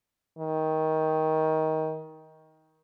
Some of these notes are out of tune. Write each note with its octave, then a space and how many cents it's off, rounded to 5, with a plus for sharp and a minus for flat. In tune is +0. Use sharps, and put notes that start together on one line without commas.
D#3 +20